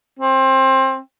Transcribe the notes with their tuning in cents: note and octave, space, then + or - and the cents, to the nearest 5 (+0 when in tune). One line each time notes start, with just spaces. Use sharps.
C4 +25